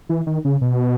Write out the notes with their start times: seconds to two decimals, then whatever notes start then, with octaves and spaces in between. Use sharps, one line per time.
0.09 E3
0.27 D#3
0.45 C#3
0.61 B2